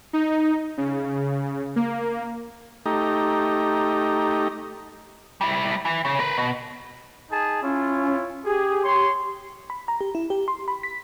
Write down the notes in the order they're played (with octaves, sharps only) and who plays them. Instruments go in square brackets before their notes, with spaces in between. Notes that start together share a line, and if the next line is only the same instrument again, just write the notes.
[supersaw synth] D#4
C#3
A#3
[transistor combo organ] A3 D#4 G4 A#5
[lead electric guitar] G3 E4
E3
C#3
A#4 B4
B2
[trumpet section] D#4 G#4 A5
[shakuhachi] C#4 [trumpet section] E4 F4 C#5
[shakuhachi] G4 [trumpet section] G#4
[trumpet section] C#5 C6
[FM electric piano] B5
A#5
G4
E4
G4
C6
B5
B6